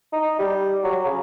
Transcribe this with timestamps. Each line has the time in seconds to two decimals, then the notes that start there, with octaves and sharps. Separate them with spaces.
0.12 D#4
0.39 G3
0.84 F#3
1.06 C#3